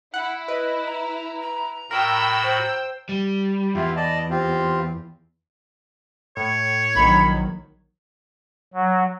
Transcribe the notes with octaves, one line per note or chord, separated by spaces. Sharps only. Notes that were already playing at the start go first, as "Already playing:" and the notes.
E4 F#5
B4 D#5
A#5
A#5
A2 F#4 A#4 G5 B5 E6
C5
G3
E2 E4 F4 G4
D5 D#5 A5
C4 F4 G4
A2 C#5
A#1 D#3 F#3 B5 G#6
F#3